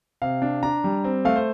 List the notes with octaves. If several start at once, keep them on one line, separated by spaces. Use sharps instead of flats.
C3 F5
D4
D4 A#5
G3
C4
A3 F5
C5